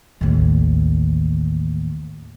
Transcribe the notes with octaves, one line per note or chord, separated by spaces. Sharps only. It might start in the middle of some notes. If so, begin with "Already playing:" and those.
A1 D#2